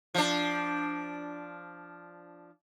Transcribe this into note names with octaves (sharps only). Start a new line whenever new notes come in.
F3 D4